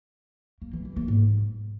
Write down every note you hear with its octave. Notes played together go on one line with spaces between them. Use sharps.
A#3
E3
E3
A#3
G#2